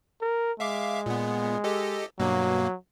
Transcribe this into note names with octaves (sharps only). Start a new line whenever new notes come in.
A#4
G#3 E5 F5 D6
A#2 B3
G4 A4 D#5
G2 B2 F#3 A#3